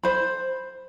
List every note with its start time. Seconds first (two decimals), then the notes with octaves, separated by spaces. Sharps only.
0.03 C5 B5